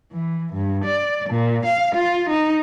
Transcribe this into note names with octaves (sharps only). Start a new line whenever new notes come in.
E3
G2
D5
A#2
F5
F4
D#4